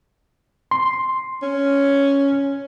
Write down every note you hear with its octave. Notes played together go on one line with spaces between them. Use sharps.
C6
C#4